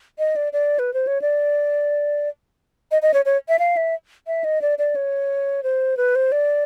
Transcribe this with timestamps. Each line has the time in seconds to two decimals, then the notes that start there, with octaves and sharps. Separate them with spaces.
0.19 D#5
0.36 D5
0.53 D5
0.79 B4
0.94 C5
1.07 C#5
1.22 D5
2.91 D#5
3.02 D#5
3.14 C#5
3.25 C#5
3.49 E5
3.59 F5
3.77 E5
4.27 E5
4.44 D#5
4.62 D5
4.78 D5
4.96 C#5
5.63 C5
5.97 B4
6.15 C5
6.32 D5